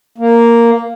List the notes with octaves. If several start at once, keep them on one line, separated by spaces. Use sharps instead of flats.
A#3